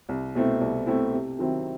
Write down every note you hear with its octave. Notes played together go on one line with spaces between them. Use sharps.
C2
B2 A3 C4 E4
C2
B2 A3 C4 E4
C3
D#3 F#3 C4 E4